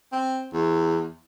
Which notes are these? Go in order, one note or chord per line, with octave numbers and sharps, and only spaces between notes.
C4
E2